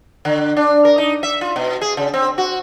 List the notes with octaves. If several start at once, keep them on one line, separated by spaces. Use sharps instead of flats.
D3
D4
A#4
D#4
E5
F4
B2
G#4
C#3
C4
F#4